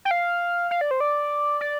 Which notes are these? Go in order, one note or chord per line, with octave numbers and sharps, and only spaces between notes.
G5
F5
F5
D5
C5
D5
D5